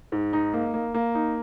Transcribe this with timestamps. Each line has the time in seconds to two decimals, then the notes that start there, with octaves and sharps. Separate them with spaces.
0.12 G#2
0.33 D#4
0.53 A#3
0.74 A#3
0.94 A#3
1.15 D#4